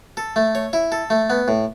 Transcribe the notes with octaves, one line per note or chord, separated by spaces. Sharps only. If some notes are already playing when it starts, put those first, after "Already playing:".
A4
A3
C#5
E4
A4
A3
B3
A2